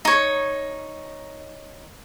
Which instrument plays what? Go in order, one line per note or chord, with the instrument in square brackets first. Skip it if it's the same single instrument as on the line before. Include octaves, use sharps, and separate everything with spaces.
[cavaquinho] D#4 C#5